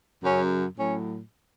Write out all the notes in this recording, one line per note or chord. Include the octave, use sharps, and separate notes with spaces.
F#2 C#3 F#3 C#4
A2 F#3 C#4